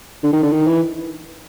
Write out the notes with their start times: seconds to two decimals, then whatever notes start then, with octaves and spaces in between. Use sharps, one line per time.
0.23 D3
0.33 D#3
0.43 D3
0.52 D#3
0.67 E3